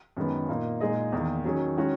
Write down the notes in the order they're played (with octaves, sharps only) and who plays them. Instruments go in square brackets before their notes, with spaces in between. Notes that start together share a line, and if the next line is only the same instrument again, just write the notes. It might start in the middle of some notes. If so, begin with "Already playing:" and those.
[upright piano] F#2 D#3 G#3 B3
A#2 A#3 D#4 A#4
A#2 G#3 D#4 G#4 D#5
E2 D#3 A#3 D#4
D#3 F#3 C#4 G#4
D#3 G#3 C#4 F#4